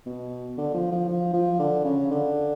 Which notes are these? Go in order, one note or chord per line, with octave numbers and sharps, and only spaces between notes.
B2
D3
F3
F3
F3
F3
D3
C#3
D3